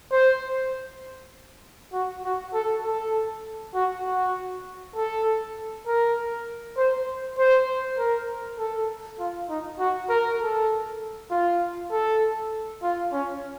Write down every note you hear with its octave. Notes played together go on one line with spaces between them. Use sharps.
C5
F#4
F#4
A4
A4
F#4
F#4
A4
A#4
C5
C5
A#4
A4
F4
D#4
F#4
A#4
A4
F4
A4
F4
C#4